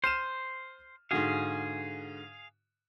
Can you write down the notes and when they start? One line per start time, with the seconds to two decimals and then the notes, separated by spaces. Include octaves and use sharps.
0.04 C5 F6 D#7 E7
1.11 G#2 D3 F#4 G#4 F5